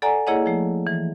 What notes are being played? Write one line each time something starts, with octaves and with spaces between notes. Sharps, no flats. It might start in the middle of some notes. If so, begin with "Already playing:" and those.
A4 D5 F#5 G#5 A#5
A#3 E4 G#4 C#5 D#5 F#5
F3 A3
E3